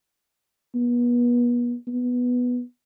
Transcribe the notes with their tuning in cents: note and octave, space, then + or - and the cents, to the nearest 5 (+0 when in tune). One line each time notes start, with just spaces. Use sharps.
B3 -35
B3 -5